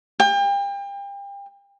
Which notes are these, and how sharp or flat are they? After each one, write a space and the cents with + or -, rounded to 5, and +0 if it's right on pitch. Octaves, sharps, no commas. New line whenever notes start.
G5 +35